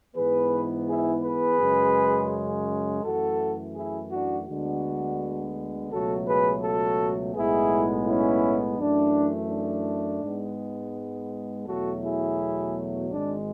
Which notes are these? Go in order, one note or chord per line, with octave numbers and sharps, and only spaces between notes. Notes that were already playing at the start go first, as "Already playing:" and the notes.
G#2 E3 B3 G#4 B4
E4 G#4
G#4 B4
F#2 C#3 G#3
F#2 E3 A3 F#4 A4
E4 G#4
D4 F#4
D2 D3 G#3 B3 D4 F#4
C#2 B2 F#3 A3 F#4 A4
G#4 B4
F#4 A4
B1 A2 G#3 B3 E4 G#4
C#4 E4
F#2 E3 A3 D4
D4
G#2 G#3 B3
E2 B2 F#3 A3 F#4 A4
E4 G#4
G#1 G#2 G#3 D4